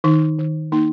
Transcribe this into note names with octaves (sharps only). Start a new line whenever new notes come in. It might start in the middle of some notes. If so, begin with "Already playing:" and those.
D#3 D#4
D#3
A#3 D#4